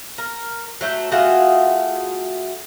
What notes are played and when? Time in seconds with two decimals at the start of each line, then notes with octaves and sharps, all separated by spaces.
0.18 A#4
0.81 F#3 A3 G5
1.11 A3 F4 F#4 G#4